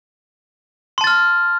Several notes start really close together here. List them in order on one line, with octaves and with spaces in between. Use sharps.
C6 A5 A6 F6